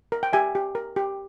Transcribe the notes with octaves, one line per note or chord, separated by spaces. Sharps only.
A#4
G5
G4 E5 G#5
G4
A#4
G4